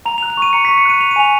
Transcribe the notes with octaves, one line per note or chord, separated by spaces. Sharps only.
A#5 F7
F7
F#6
F7
C#6 D#7
A#5 C#7
C#6 B6
C#7
F#6 D#7
F#6 F7
D#7
G#5 F7